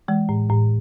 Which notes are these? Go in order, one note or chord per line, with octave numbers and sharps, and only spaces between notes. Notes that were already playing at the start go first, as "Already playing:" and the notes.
E3 G#3
A2
A2